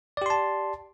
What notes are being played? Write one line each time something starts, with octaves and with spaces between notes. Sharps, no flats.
G4 D5 A5 C6